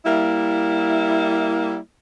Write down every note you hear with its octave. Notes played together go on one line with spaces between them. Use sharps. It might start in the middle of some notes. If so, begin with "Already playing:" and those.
G3 A#3 E4